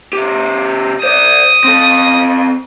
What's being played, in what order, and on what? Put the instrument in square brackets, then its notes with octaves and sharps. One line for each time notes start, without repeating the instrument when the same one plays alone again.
[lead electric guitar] C#3 G4
[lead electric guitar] C5 D5 [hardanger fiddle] D#6
[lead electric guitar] C4 A4